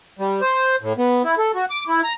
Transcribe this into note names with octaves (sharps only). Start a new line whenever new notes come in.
G3
C5
A2
B3
E4
A4
F#4
D6
E4
A#5